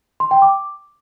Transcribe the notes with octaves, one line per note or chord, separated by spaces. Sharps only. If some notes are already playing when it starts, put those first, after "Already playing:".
C6
G5
D6